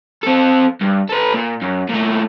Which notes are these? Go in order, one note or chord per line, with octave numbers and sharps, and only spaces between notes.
C4 A4
G2
A4 B4
A#2
F#2
A#2 A3